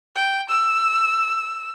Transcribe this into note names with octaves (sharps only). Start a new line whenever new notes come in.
G5
E6